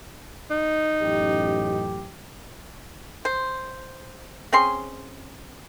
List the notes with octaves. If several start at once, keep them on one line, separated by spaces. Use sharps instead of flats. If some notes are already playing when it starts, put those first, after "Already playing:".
D#4
A1 F#2 G4
C5
C4 C#4 G#4 C6